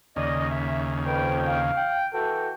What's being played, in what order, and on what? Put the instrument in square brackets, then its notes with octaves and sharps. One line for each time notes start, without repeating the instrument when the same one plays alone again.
[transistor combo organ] D#2 C#3 [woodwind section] D5 D#5
[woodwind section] E5
[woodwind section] F2 G5 [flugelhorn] B4
[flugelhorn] F5
[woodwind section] G5
[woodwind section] E3 F#4 G5 [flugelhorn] A4